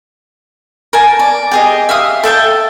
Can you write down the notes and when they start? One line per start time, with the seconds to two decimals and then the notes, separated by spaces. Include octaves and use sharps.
0.93 A#4 G#5 A5
1.19 D5
1.51 G4 G#4 D#5
1.89 E5 F5 D#6
2.23 A4 E5 G5 A5